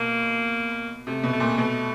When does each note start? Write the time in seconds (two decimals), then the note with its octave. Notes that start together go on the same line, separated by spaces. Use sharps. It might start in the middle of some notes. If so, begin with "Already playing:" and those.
Already playing: B2 A#3
1.07 C3 A3
1.24 B2
1.32 A3
1.40 A#2
1.57 B2 A3